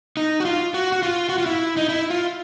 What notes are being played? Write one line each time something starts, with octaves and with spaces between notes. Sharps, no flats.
D#4
F#4
F4
F#4
F#4
F4
F#4
F4
E4
D#4
E4
F4